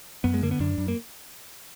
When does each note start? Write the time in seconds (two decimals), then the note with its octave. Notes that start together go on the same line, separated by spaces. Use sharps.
0.24 F#2 B3
0.34 G#3
0.42 D3 A#3
0.51 B3
0.60 F#2 D4
0.78 F#2
0.88 A#3